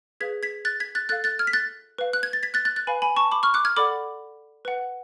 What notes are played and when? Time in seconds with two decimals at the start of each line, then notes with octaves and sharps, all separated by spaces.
0.20 G#4 B4 F5 G#6 B6
0.43 G#6 B6
0.65 F#6 A6
0.80 G#6 B6
0.95 F#6 A6
1.09 A4 F5 F#6 A6
1.24 F#6 A6
1.39 F6 G#6
1.47 B6
1.53 F#6 A6
1.98 B4 F5
2.13 F#6
2.23 G#6
2.33 A6
2.43 G#6 B6
2.54 F#6 A6
2.65 F#6 A6
2.76 F#6 A6
2.87 B4 F5 G#5 B5
3.02 G#5 B5
3.17 A5 C#6
3.31 B5 D6
3.43 C#6 F6
3.54 D6 F#6
3.65 F6 G#6
3.77 A4 D5 F#5 B5 D6
4.65 B4 F#5